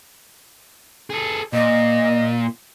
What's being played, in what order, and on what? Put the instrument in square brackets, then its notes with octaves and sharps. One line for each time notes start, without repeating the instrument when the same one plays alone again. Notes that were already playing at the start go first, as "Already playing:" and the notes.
[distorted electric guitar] G#4 A4
[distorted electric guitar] A#2 [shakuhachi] D#5